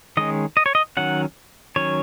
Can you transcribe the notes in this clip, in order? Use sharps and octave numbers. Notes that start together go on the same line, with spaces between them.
D#3 G#3 C#4 D#5
D#5
C#5
D#5
D#3 F#3 C#4 F#5
D#3 F#3 C#4 C#5